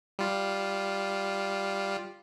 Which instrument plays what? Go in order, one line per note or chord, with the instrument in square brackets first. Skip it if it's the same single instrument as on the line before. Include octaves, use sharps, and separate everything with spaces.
[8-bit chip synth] G3 F4